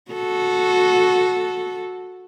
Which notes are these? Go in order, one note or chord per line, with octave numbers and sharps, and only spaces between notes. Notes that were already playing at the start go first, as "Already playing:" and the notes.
F#4 A4